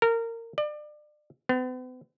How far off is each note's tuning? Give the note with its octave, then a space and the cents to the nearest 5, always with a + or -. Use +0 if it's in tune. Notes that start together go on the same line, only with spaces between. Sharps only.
A#4 -20
D5 +30
B3 +45